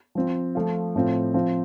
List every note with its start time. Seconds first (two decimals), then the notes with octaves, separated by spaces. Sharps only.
0.15 F3 C4 F4
0.55 F3 A3 F4
0.95 A2 F3 C4 F4
1.34 F3 C4 F4